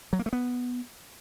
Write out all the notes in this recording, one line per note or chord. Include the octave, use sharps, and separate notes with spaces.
F#3
A#3
A3
B3